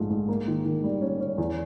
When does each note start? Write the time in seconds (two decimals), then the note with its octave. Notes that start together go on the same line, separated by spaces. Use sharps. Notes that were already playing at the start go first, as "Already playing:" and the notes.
Already playing: A#1 G#2 F3 A3
0.10 G#2
0.28 A#3
0.47 D#3
0.65 D#3
0.84 G3
1.01 C#4
1.20 C#4
1.38 E2